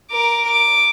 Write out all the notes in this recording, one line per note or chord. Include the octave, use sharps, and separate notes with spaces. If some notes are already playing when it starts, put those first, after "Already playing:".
A#4 D6
D6